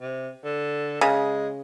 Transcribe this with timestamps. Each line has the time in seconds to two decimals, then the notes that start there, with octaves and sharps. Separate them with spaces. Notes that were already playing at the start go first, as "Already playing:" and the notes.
0.01 C3
0.44 D3
1.01 C#3 G#3